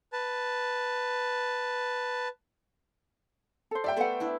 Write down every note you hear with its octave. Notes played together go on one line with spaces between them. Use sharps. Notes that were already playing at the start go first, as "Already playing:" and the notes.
B4 A5
A4 C5
G3 D5 E5 G5
A3 B3 A4 C5 F#5
D4 E4